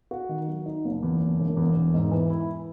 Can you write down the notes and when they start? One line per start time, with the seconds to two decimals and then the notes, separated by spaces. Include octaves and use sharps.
0.11 F#4
0.29 D#3
0.48 F#3
0.66 D#4
0.84 F#1
1.03 E2
1.21 F#1
1.39 E1
1.57 E2
1.76 E1
1.94 G#2
2.11 E3
2.30 E4